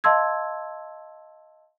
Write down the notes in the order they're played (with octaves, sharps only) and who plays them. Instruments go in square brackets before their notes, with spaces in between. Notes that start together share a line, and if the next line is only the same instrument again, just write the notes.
[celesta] D#5 F5 A5 C6 E6 G#6